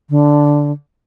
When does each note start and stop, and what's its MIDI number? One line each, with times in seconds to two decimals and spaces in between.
0.10 0.71 50